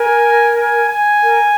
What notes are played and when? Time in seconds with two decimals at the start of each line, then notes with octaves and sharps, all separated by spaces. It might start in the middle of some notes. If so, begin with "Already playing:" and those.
Already playing: A#4 G#5
0.55 G#5
0.89 G#5
1.23 A#4